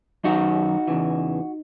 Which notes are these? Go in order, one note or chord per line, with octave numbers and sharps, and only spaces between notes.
F#2 D#3 F#3 D#4 F#4
E2 C#3 E3